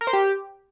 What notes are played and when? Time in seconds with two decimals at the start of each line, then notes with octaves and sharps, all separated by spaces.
0.01 A#4
0.07 C5
0.13 G4